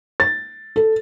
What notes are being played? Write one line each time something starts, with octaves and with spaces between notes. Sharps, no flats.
A6
A4